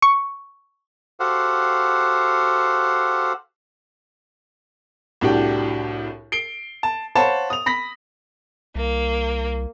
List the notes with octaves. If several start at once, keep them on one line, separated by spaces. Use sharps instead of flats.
C#6
F#4 G4 A4 C5 F5 F#5
C2 A2 D4 F#4 G4
C7 D7 G7
A5
C5 C#5 F5 F#5 A5 B5
D#6 F7
B5 A#6 B6
C2 A#3